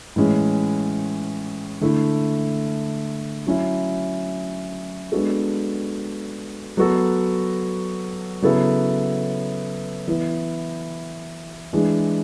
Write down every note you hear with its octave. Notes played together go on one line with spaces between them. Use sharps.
A2 E3 G#3 C#4
D3 A3 E4
F#3 C#4 E4
G#3 B3 D4 F#4 A4
F#3 B3 F#4 A4
C#3 F#3 B3 E4 A4
E3 B3 E4
E3 G#3 D4 G#4